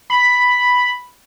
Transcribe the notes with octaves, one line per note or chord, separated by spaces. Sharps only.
B5